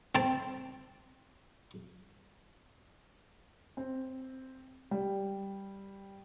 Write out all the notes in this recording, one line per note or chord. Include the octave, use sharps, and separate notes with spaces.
C4 A5
C4
G3